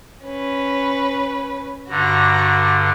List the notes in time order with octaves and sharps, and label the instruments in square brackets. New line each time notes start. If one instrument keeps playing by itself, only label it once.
[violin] C#4 B4
[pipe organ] G2 D3 [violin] F#4 A#5